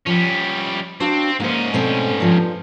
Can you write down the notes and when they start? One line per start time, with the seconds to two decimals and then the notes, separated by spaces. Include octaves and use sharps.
0.07 F3 G3 C#4
1.00 C4 D4 F#4 F5
1.40 G#2 A#3 C#4 C5
1.73 B2 A3 C4
2.20 G2 F3